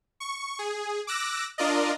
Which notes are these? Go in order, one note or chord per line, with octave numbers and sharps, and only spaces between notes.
C#6
G#4
D6 E6 F#6 A#6
D4 F4 A#4 D5 D#5